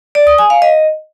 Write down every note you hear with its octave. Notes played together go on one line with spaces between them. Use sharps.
D5
D#6
G#5
F5
D#5